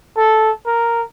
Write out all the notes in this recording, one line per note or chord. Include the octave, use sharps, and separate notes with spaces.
A4
A#4